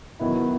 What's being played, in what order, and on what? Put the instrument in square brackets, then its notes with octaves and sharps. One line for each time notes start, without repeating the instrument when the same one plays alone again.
[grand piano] D#3 F#3 B3 E4